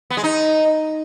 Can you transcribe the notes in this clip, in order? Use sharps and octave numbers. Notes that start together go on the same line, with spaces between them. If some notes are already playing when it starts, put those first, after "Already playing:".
B3
G#3
D#4